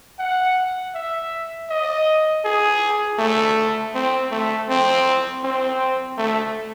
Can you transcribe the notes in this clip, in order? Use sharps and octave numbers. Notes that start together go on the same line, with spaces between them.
F#5
E5
D#5
G#4
A3
C4
A3
C4
C4
A3